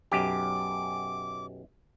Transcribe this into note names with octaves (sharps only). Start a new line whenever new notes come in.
B1 F#2 G4 D6